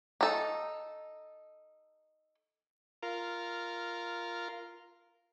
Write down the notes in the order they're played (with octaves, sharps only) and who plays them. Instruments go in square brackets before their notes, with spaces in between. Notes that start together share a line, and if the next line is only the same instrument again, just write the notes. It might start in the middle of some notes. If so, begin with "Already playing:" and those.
[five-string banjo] D#4 A4
[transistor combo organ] F4 A#4